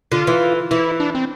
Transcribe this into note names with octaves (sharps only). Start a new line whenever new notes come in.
D3 F4
E3
E3 E4
D4
C4